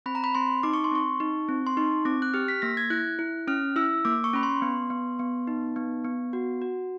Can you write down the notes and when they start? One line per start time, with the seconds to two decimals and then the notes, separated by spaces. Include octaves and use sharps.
0.06 C4 B5
0.15 A#5
0.24 B5
0.35 C4 C6
0.63 D#4 D6
0.73 C#6
0.84 C6
0.91 C4 C#6
1.20 D#4
1.49 C4
1.67 C6
1.77 D#4 C#6
2.05 C4 D6
2.22 F#6
2.34 G4 F6
2.48 B6
2.62 A#3 A#6
2.77 G#6
2.90 E4 F#6
3.19 E4
3.47 C#4 F6
3.76 E4 E6
4.05 A#3 D6
4.24 C#6
4.34 C#4 B5
4.43 C6
4.62 B3
4.90 B3
5.19 B3
5.47 D#4
5.76 B3
6.05 B3
6.33 F#4
6.62 F#4